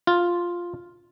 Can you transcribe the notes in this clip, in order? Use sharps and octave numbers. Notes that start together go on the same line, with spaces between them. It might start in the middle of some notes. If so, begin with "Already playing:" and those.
F4